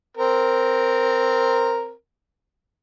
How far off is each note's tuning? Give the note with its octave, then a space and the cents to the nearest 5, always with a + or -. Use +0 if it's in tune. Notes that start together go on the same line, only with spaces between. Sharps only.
C4 +0 A#4 +0